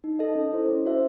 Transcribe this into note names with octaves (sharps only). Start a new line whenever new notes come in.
D#4
A4 D#5
C#4
E4 C5
C#4
F#4 C5 E5